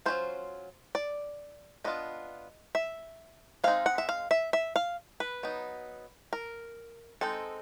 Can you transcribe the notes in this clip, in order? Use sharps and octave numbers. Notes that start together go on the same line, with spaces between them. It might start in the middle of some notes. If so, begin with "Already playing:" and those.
F#3 A3 C#4 F4 C5
D5
G3 B3 D4 F4 D#5
E5
G#3 C4 D#4 F5
F#5
E5
F5
E5
E5
F5
B4
F#3 B3 D#4
A#4
G#3 C4 D#4 A4